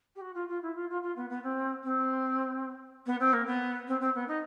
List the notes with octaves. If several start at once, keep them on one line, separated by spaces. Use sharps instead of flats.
G4
F#4
F4
F4
E4
F4
F4
F4
B3
B3
C4
C4
B3
C4
A#3
B3
C4
C4
B3
D#4